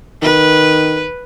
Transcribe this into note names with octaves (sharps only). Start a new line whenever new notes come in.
D#3 B4